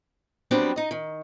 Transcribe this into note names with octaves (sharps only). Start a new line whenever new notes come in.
F#3 G3 B3 C4 D4
D#4 D#5
D#3